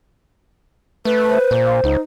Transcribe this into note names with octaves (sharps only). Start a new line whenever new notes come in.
A3 B4
C5
A#2
F5
C#2 D#4